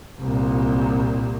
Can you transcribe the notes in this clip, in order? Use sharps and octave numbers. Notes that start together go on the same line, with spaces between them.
C2 A#2